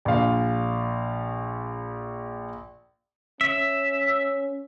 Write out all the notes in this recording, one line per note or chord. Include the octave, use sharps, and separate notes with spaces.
A#1 F5
C#4 E5